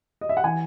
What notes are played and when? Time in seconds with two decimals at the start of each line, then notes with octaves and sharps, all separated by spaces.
0.21 D#5
0.29 E5
0.37 F#5
0.44 E3 G#5